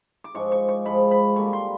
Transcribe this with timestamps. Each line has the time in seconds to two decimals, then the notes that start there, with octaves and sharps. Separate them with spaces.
0.24 D6
0.34 G#2 F3 G#3 C#6
0.52 C#6
0.69 C#6
0.85 G#2 F3 G#3 B5
1.11 B5
1.36 D3 G3 A#3 C#6
1.53 C6